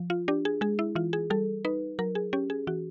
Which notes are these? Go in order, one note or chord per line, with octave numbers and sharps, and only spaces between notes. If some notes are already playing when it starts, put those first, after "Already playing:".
Already playing: F3
F4
D4 G4
G#4
G#3 G#4
E4
E3 F4
G#4
G3 A4
D#4 B4
F#3 A#4
G#4
C#4 G4
G#4
E3 F#4